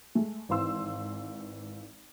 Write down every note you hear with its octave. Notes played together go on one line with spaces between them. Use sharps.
G#3 A3
G#1 E3 C4 F5 C6 E6